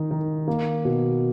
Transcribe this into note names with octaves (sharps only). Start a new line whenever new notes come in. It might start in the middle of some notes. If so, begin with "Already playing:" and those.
Already playing: D#3 D#4
D#3
A#3
B2